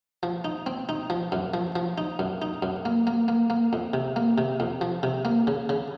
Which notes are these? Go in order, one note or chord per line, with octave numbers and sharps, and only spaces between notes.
F3
D#4
C4
D#4
F3
F#2
F3
F3
D#4
F#2
D#4
F#2
A#3
A#3
A#3
A#3
F2
C3
A#3
C3
F2
F3
C3
A#3
C#3
C#3